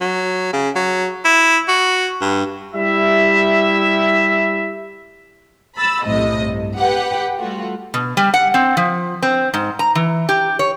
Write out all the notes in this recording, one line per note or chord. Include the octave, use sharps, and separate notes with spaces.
F#3
C#3
F#3
E4
F#4
G2
G3 E4 E5
B5 E6 A6
B1 F#2 A2 C3 D#5
G2
G4 B4 F#5
G3 A3 F4 F#4
B2
G3
F#5
C4
F3
C4
G#2
A#5
E3
G4
C#5